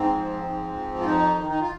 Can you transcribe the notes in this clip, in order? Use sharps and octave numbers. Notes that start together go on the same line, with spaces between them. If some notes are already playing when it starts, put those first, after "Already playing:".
Already playing: G#2 C4
F3
G#2
F3
F4
F2 D#4
D#3
D#4
F4